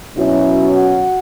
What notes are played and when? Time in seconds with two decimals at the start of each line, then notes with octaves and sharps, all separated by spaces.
0.16 B2 F#3 C#4 E4
0.73 F#4